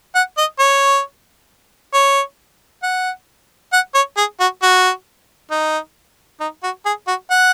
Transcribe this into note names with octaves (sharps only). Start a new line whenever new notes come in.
F#5
D#5
C#5
C#5
F#5
F#5
C#5
G#4
F#4
F#4
D#4
D#4
F#4
G#4
F#4
F#5